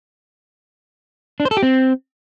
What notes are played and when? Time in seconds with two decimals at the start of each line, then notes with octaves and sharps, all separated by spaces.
1.40 D4
1.45 C5
1.51 A4
1.57 G4
1.63 C4